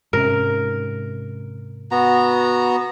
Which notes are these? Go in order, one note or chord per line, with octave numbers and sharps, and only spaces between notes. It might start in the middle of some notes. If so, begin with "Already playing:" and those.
G#2 C3 C#4 A#4
B3 F#4 A#5